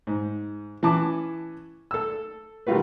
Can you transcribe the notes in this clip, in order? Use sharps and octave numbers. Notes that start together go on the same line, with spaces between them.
G#2
E3 C#4 A5 D6
A4 E6
D#3 G3 A3 F4 F#4 B4